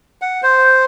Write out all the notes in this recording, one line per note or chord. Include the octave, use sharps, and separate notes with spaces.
F#5
C5